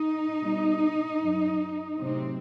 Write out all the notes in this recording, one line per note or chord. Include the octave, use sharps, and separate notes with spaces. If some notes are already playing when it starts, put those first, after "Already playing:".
Already playing: D#4
B2 G3
F#2 F#3
A2 C3 F#3 C4